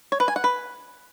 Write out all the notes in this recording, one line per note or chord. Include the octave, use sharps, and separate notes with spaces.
C#5
B4
G#5
F#5
B4